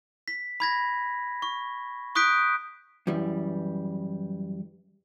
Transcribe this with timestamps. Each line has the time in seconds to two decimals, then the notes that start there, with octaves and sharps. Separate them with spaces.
0.28 B6
0.60 B5 G#6 A#6
1.42 C#6
2.15 C#6 D#6 F#6 G6 B6 D7
3.07 F#2 E3 G3